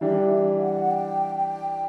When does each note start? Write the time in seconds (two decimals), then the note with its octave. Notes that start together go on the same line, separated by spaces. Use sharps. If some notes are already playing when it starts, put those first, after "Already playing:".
0.01 E3 G3 D4 G4 E5
0.32 E5
0.61 F#5
0.91 G5
1.36 G5